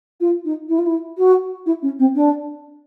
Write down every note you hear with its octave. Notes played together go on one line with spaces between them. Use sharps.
F4
D#4
E4
F4
E4
F#4
E4
C#4
C4
D4